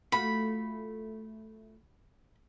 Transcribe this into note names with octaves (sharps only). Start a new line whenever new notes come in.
A3 F4 F#4 B5